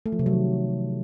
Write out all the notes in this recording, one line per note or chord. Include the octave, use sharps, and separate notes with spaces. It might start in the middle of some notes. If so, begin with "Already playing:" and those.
A3
F3
C3
F#3
D#3